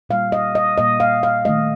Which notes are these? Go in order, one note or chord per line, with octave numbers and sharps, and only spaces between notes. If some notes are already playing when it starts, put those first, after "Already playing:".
A#2 G3 A#3 F5
D#5
D#5
A#2 G3 A#3 D#5
F5
F5
D#3 A3 D#5